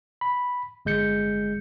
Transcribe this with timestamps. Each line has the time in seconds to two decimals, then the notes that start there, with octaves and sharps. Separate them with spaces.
0.21 B5
0.85 G1 G#3 G6 C#7